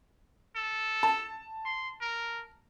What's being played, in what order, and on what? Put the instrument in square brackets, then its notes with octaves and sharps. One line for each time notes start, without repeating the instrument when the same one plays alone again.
[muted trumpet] A4
[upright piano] A5
[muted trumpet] C6
A#4